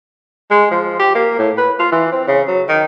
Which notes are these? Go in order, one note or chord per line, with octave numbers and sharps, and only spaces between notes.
G#3
F3
G4
A#3
A2
B4
F4
E3
C4
C#3
F#3
D#3